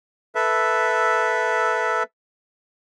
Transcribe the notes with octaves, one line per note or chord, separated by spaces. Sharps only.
A4 B4 E5